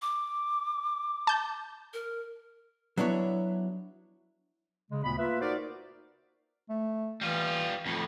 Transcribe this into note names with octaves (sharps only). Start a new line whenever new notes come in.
D6
A5 G6
A#4
F#3 B3 D4 E4 C#5
C#3 G#3
D2 A#2 B3 B5
A#3 F4 B4 E5
D#4 F#4 A#4 C5 D5
A3
E3 G3 F4
F2 A2